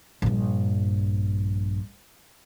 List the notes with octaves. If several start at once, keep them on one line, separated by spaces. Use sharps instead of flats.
A#1 G2